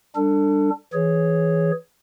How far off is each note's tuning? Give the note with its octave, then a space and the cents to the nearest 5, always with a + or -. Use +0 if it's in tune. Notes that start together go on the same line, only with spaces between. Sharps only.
G3 +10 D4 +5 A4 +35
E3 +5 G#4 +0 C#5 +0